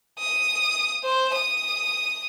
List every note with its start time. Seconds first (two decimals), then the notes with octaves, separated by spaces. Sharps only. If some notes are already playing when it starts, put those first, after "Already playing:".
0.19 D#6
1.05 C5
1.35 D#6